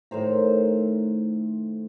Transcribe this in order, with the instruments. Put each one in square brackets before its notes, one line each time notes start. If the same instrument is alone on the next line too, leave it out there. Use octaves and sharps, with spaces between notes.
[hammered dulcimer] A2 D#3 C5 A#5